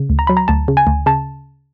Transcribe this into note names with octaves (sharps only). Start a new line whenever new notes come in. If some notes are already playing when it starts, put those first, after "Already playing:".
Already playing: C#3
D2
A#5
F#3 B5
A#5
D2 A5
C#3
G#5
D2
C#3 A5